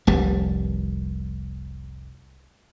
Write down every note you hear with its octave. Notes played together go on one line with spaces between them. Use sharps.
F1 C2 G3